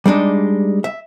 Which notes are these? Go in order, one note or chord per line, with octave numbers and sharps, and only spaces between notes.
G3 G#3 D4 D#4
E5